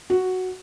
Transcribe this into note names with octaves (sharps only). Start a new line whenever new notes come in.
F#4